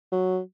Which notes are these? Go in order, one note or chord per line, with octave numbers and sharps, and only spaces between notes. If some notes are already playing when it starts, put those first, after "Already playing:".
F#3